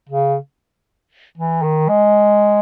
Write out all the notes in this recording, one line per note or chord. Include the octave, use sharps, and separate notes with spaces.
C#3
E3
D#3
G#3